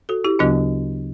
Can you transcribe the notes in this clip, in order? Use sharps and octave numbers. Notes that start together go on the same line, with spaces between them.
F#4 A4
E4 G4
D2 C#3 F#3 B3 D4 F#4